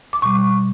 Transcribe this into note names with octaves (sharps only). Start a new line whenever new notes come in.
D6
B2 G3 C#6